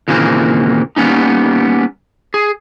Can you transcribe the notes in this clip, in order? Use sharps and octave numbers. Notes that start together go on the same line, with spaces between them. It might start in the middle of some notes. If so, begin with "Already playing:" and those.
D#2 A#2 C#3 E3 A#3 C4
G3 A#3 B3 C#4 D#4
G#4